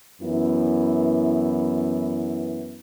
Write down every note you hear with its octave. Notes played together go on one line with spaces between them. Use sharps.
F#2 E3 B3 E4